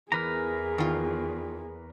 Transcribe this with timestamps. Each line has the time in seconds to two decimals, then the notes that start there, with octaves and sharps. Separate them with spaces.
0.12 E2 E3 G#4 A#4 B4 A#5
0.78 D#3 F4